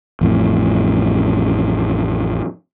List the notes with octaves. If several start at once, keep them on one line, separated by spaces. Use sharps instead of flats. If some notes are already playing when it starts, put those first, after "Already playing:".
A1 F2 A2